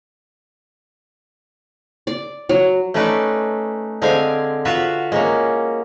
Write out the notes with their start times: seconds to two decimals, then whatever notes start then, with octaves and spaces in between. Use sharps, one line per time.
2.07 D5
2.49 F#3
2.94 A3 C#4 D#4 B4 D5
4.02 D3 G#3 C4 G#4 F5 G#5
4.65 F4 F#4 B4 E5 F#5
5.12 G#3 A#3 C#4